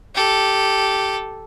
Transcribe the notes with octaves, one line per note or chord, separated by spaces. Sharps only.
G4 A4